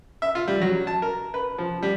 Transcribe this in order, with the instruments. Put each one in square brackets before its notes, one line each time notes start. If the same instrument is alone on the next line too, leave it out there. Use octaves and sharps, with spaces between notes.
[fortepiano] E5
F4
G3
F#3
A5
A#4
B4
F3
G3